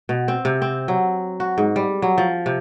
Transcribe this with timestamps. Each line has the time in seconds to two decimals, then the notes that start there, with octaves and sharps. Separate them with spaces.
0.09 B2
0.28 C4
0.45 C3
0.62 C4
0.88 F#3
1.40 F#4
1.58 G#2
1.76 G3
2.02 F#3
2.18 F3
2.46 C3